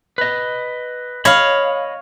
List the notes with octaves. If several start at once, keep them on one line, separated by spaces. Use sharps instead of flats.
B4 D#5
C#5 D#5 F5 B5